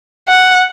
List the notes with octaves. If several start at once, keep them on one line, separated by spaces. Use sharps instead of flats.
F#5